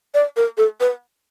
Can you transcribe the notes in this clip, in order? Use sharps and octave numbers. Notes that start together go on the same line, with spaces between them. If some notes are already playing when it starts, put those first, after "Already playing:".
D5
A#4
A4
B4